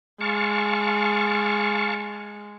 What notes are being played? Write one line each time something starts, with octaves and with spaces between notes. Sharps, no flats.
G#3 F5 A5 C#6